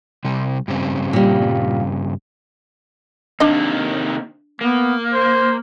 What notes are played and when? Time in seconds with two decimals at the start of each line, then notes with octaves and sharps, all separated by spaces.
0.25 C3 G3 C4
0.68 G2 C#3 C4
1.13 A#2 G3
3.40 C3 D#3 A#3 D4 D#5
4.61 A#3 B3
5.13 C5